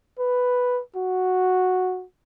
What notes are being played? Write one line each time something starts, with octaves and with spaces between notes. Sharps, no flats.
B4
F#4